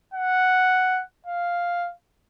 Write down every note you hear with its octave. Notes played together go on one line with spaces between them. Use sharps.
F#5
F5